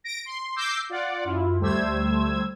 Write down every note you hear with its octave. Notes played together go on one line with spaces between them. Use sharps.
A#6 D7
C6
D6 E6 G6 A#6 C7
F4 D5 F#5
F#2 E4 F4
D2 G3 A3 C5 E6 G#6